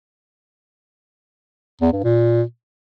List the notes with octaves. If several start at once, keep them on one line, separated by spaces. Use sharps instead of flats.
E2
G2
A#2